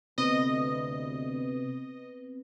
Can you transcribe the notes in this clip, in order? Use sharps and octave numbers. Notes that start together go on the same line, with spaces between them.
D2 C3 B3 C4 B4 D#5